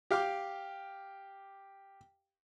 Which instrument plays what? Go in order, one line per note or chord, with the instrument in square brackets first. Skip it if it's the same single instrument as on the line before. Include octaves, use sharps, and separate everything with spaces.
[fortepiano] G4 F5 G5 D6